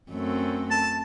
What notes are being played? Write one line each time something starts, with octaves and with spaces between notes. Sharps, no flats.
F#2 A3 C4
A5